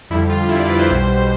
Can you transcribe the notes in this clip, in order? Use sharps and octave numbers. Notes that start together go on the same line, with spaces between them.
F2 D3 G3 E4
F4
F2 D3 G3 E4
D5
B4
C5
B1 B2 G3